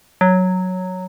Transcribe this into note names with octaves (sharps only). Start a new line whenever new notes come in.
F#3